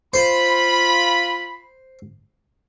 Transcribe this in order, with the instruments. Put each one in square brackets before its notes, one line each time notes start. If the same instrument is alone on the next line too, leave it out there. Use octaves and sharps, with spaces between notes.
[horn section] F4 B5 [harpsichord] C5